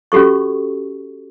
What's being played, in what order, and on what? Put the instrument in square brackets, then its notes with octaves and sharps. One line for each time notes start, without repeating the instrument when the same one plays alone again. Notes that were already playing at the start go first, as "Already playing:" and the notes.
[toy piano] C#4 F#4 G4 A4 C#6